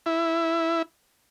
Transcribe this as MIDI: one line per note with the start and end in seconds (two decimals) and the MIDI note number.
0.06 0.82 64